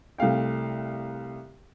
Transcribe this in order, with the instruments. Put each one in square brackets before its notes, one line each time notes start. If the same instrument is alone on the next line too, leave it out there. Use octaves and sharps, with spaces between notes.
[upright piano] C2 A3 F5 G5